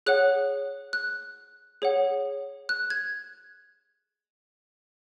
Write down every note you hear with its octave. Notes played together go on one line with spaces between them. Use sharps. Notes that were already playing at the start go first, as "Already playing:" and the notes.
G#4 C#5 F#5 F#6
F#6
G#4 C#5 F#5
F#6
G#6